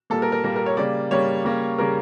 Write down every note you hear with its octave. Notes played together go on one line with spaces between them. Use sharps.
A#2 G3 A#3 A4
A#4
A#4
A#2 G3 A#3 A#4
A#4
C#5
C#3 G3 A#3 D5
C#3 G3 A#3 C#5
C#3 G3 A#3
C#3 G3 A#3 A#4